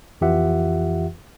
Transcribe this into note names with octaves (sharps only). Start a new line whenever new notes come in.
F2 E3 F4 G4 E5 F#5